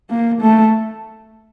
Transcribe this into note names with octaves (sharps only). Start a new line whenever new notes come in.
A#3
A3